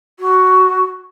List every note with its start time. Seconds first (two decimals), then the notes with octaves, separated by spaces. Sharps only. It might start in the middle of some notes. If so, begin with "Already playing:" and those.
0.19 F#4